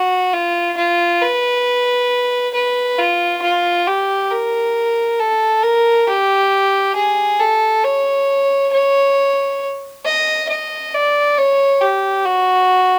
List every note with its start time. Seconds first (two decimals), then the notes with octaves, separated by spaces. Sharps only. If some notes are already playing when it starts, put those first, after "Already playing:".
Already playing: F#4
0.33 F4
0.77 F4
1.22 B4
2.54 B4
2.99 F4
3.42 F4
3.87 G4
4.31 A#4
5.19 A4
5.63 A#4
6.07 G4
6.96 G#4
7.40 A4
7.84 C#5
8.73 C#5
10.05 D#5
10.49 D#5
10.94 D5
11.38 C#5
11.81 G4
12.25 F#4